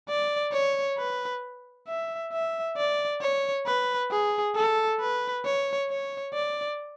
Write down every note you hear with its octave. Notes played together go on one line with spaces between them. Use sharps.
D5
C#5
B4
E5
E5
D5
C#5
B4
G#4
A4
B4
C#5
C#5
D5